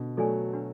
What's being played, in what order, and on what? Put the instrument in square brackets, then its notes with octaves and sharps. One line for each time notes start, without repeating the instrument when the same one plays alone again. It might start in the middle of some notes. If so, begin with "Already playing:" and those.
Already playing: [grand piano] B2 D3
[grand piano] F#3 A3 [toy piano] A4 D5 G#5
[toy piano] D4 F#4 B4